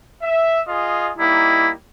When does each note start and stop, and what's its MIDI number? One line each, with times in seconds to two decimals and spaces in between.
0.21 0.61 76
0.67 1.10 65
0.67 1.10 68
0.67 1.10 75
1.19 1.73 55
1.19 1.73 58
1.19 1.73 63
1.19 1.69 64